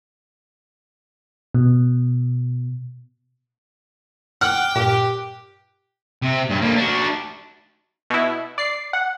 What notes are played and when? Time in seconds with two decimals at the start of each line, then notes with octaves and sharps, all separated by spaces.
1.54 B2
4.41 F#5 G5 D6 F6 F#6
4.76 G2 A#2 G4
6.22 C3
6.50 G2
6.61 D3 A#3
6.76 D4 F#4
8.10 B2 E4
8.58 D5 C7
8.93 F#5